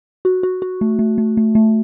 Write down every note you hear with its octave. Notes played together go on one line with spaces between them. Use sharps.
F#4
F#4
F#4
A3
A3
A3
A3
A3